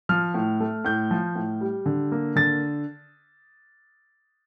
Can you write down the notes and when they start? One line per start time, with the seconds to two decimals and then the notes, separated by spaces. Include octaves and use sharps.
0.09 F3 F6
0.34 A2
0.60 A3
0.85 A2 G6
1.11 F3
1.35 A2
1.61 G3
1.86 D3
2.12 A#3
2.36 D3 A6